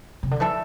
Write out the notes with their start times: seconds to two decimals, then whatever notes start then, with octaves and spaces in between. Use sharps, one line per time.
0.23 C3
0.31 D3
0.40 E3 A3 D4 A4 E5